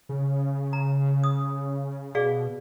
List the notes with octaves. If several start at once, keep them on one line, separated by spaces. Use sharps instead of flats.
C#3
A#5
D#6
B2 G#4 D5 F5